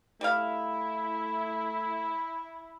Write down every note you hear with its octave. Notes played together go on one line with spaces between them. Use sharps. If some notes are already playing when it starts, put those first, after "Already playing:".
G3 A3 E4 F5